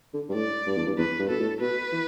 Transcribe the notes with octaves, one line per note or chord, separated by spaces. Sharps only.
D3
G2
A2 D5
G2
E2
G2
E2 B4
G2
B2 A4
A2
B2 B4
E3